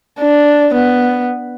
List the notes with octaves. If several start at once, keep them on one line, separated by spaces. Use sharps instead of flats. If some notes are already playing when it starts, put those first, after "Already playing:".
D4
B3